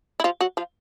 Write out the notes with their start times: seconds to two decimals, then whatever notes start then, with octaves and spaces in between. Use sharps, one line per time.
0.20 E4
0.24 F3 F4
0.40 F#3 F#4
0.57 F3 F4